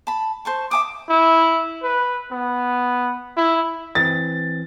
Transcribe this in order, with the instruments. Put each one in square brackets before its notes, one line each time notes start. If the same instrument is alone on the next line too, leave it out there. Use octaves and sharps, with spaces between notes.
[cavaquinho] A5 B5
C5 A5 C#6
[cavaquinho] E5 G#5 D#6 [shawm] D6
[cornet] E4
B4
B3
E4
[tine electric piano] E3 C4 [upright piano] A6